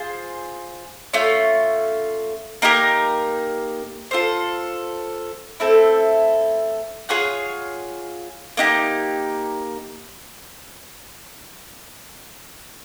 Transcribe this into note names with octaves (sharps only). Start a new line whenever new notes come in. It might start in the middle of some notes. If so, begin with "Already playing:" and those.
Already playing: F4 G#4 C5
A3 C#4 F4
A#3 D#4 G4 A#4
F4 A4 C5
A3 C4 E4 A4
F4 G#4 C#5 F#5
A#3 D#4 G4